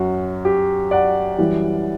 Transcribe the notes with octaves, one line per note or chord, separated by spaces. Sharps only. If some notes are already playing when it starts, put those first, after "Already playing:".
Already playing: F#2 F#3 F#4
G4
D5 F#5
F#2 E3 G3